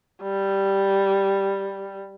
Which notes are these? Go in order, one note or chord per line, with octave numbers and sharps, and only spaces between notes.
G3